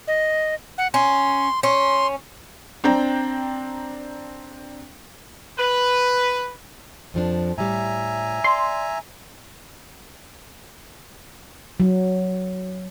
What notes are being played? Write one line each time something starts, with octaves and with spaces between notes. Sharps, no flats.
D#5
F#5
C#4 C6
C#4 C6
C4 D4 G5 A#5
B4
F2 F3 D4
A2 G3 E5 G#5 A#5
D5 C6
F#3